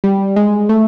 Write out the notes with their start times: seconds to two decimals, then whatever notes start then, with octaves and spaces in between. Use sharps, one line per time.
0.04 G3
0.36 G#3
0.69 A3